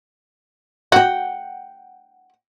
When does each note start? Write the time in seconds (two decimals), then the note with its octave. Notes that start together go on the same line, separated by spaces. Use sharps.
0.92 F#4 F#5 G5